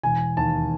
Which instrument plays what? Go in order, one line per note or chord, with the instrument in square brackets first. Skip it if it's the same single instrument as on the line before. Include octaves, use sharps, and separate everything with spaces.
[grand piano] E1 G#5
D#2 A5